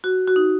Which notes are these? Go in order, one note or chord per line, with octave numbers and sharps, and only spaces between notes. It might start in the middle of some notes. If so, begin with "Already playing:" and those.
F#4
F#4
D#4